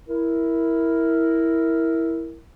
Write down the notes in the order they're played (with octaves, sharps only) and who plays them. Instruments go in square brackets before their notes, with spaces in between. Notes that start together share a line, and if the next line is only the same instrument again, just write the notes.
[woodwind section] E4 A#4